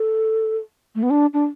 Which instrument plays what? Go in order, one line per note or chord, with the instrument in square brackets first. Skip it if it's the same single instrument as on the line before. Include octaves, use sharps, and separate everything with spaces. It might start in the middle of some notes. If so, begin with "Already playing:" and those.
Already playing: [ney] A4
A3
B3
D4
D4